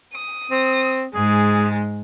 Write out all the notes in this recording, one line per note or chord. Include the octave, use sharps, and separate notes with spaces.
D#6
C4
G#2 G#3 G#4